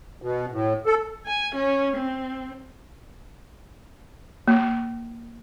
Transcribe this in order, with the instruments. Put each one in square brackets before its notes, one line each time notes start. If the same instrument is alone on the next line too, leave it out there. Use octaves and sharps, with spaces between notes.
[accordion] B2
A2
A4
[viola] G#5
C#4
C4
[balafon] A#3